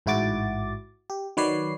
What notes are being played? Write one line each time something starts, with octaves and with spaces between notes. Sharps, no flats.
A1 G#2 E4 F#4 D6 A6
G4
D#3 F#3 B4 C#5 D5 C7